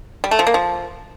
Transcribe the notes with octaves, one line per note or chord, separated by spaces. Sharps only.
G3
A3
F3
A#3
F3